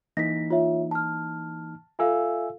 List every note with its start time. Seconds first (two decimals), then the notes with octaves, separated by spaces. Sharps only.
0.17 E3 A#3 D#4 A#6 B6
0.51 F4 C#5 E5
0.91 A5 F6
1.99 F4 A4 E5 F5 G#5 E6